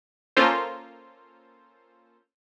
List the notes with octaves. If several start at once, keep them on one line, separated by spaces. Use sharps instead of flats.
A#3 C#4 F4 A4 C5